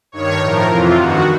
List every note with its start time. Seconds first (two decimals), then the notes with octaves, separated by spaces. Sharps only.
0.12 G2 D#3 C#5
0.40 A2 F3 A#4
0.68 F2 C3 E3 F4
0.96 G2 D#3 F#4